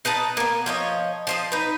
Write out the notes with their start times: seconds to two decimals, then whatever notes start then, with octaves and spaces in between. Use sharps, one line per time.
0.05 D#4 B4 D#5 A5
0.37 A#3 B3
0.66 F3 C#5 D#5
1.27 F3 C5 D#5
1.52 D#4 B4